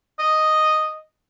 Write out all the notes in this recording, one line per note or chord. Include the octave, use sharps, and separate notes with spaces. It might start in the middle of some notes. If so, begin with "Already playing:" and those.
D#5